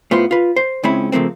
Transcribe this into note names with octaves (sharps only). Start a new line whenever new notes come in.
A2 B3 F4 C5 C6
F4 B4
C5
C#2 G#3 C4 C#4 E4 B5
C#3 F3 A3 A#3 C4